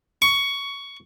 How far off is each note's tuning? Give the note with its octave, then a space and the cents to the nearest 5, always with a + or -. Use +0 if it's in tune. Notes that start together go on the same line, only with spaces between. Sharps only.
C#6 +15